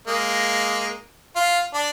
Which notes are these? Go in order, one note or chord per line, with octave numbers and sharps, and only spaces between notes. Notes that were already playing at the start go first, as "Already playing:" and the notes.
G#3 A#3
F4
D4